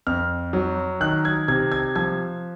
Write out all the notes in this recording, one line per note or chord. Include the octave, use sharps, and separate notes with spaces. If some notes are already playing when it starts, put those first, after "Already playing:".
F2 F6
F#3
D#3 F#6
G#6
C3 G#6
G#6
F3 G#6